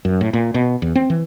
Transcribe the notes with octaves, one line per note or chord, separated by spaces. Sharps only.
F#2
A2
A#2
B2
E2
C4
E3